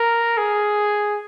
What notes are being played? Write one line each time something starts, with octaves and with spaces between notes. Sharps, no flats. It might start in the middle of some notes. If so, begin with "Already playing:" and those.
Already playing: A#4
G#4